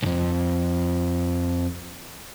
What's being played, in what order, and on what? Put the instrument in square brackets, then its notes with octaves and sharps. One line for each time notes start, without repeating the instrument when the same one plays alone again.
[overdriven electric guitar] B1 F2